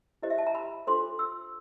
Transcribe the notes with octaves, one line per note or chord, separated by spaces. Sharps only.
E4 G4 C5 D#5
E5
A5
A#5
B5
D4 F4 A4 C5 C6
E6